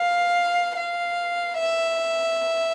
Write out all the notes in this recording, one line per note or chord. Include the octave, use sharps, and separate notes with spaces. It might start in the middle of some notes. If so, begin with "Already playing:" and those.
Already playing: F5
F5
E5